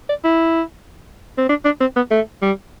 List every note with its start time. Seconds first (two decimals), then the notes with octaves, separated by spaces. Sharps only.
0.09 D5
0.24 E4
1.38 C4
1.49 D4
1.65 D4
1.81 C4
1.96 B3
2.11 A3
2.42 G3